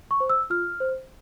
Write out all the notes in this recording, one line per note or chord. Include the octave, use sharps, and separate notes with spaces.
C#6
C5
E6
F4 F6
C5